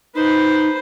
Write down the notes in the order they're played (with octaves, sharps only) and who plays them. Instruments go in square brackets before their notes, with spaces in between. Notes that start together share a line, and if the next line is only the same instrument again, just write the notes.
[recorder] D#4 [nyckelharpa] B4 C5